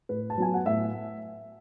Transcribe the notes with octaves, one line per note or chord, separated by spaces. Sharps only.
A2 B4
A5
F#3 B3 G#5
F#5
A2 E5